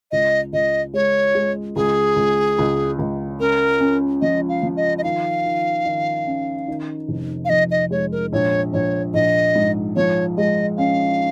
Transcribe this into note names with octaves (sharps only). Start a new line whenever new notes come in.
C#2 D#5
C#2 D#5
G#3 C#5
G#3
C#2 G#4
C#2
C#2
C#2
C#4 A#4
C#4
F3 D#5
F5
F3
D#5
D#5
D#3 F5
D#3
D#3
C#4
D#3
F1
F5
F2 D#5
D#5
G#3 C#5
A#4
A#1 C#5
A#1 C#5
A#1 D#5
G#2
F3 C#5
G#3 D#5
C#4 F5